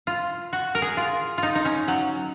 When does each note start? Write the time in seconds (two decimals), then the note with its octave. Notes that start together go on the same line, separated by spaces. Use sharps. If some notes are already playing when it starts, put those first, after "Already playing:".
0.07 F4
0.53 F#4
0.75 A#4
0.82 G#4
0.97 F4
1.38 D#4 F4
1.55 D#4
1.65 C#4
1.88 F#3